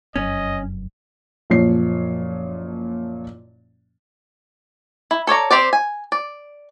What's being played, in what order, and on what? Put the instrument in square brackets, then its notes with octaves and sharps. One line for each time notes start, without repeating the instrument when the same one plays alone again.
[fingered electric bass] F1 F#2 F#3 [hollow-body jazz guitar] C#4 [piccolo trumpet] D#5
[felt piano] F#1 A#2 F3 C#5 C7
[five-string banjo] E4
A4 C#5 D5 A#5
C4 G4 C5 D5
G#5
D5